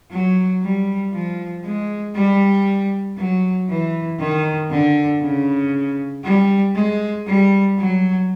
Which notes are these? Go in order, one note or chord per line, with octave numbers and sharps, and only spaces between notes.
F#3
G3
F3
G#3
G3
F#3
E3
D#3
D3
C#3
G3
G#3
G3
F#3